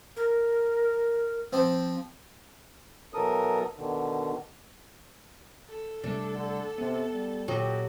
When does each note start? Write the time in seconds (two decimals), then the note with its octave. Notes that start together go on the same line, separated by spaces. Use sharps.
0.16 A#4
1.53 F3 C4
3.14 B2 E3 F#3 A4 A#4 D#6
3.77 B2 D3 D#3
5.69 A4
6.04 C3 G3 A3 D4
6.33 D3
6.78 C3 B3
7.13 G3
7.48 A#2 F#3 F#4 G4 D#5